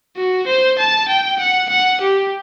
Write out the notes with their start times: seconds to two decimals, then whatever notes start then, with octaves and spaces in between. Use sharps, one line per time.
0.16 F#4
0.47 C5
0.78 A5
1.08 G5
1.40 F#5
1.70 F#5
2.01 G4